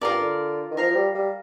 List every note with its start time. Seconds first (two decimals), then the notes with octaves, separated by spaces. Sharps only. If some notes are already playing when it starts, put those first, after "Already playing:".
0.01 G2 F4 A#4 D5
0.20 D3
0.71 D#3
0.77 F3 A#4 F5 A#5
0.90 F3
0.95 G3
1.15 G3